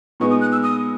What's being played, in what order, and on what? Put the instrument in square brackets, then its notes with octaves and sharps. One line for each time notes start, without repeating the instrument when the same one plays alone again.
[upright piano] A#2 G#3 B3 D#4 [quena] C#6
[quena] D#6
F#6
E6
D#6